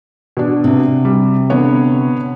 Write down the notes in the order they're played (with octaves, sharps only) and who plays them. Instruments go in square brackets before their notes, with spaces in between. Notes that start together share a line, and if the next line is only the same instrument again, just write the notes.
[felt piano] B2 D4
[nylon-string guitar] C3
[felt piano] G3
D3 B3 C#5